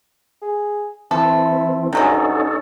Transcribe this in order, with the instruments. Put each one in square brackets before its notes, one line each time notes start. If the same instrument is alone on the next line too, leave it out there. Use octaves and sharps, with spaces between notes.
[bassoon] G#4
[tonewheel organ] E3 C4 [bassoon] E4 [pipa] A4
[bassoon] G2 [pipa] C3 F#3 G#3 [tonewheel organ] C#4 D#4 A4